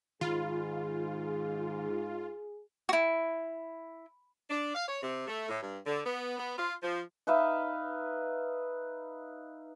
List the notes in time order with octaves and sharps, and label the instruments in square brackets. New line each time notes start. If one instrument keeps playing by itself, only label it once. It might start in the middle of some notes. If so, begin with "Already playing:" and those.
[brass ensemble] G#2 [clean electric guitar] D#3 B5 [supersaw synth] F4 [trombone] G#4
[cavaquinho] E4 F#4
[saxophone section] D4
F5
C#5
C3
A3
A2
G2
D3
B3
B3
F4
F3
[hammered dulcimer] D#4 B4 E5 F5